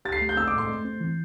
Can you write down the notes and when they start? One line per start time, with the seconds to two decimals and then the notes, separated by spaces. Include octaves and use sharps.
0.05 G4 A6
0.12 C7
0.21 A3
0.29 G6
0.37 C4 E6
0.48 D6
0.54 A2 C6
0.70 A3
0.85 C4
1.00 E3